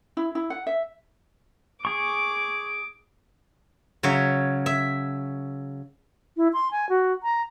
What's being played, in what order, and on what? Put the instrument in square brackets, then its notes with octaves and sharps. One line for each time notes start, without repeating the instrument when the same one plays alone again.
[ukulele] E4
E4
F#5
E5
[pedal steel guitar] G#4 C#6 [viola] D6
[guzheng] C#3 F#3 C#5 E5
E5
[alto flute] E4
C6
G#5
F#4
A#5